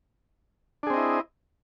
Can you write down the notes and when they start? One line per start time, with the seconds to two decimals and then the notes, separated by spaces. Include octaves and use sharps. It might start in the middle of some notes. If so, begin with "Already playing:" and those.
0.83 D4
0.87 G#4
0.90 C4
0.94 D#5
0.97 E4